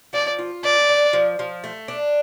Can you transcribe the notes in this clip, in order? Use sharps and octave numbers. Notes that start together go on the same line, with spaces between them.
F3 D5
F4
A3 D5
D4
F3
F3
A3
D4